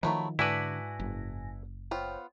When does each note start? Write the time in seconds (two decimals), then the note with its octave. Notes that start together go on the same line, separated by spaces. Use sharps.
0.03 D#3 F3 F#3 A3 E4
0.39 G#2 D3 D4 E4 F#4 B4 G#5 A#6
1.00 F#1
1.91 B3 F4 C5 C#5 G5